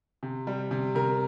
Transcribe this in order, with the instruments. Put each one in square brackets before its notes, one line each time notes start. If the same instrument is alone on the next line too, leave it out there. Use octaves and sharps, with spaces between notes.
[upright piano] C3
G3
C3
C3 A#4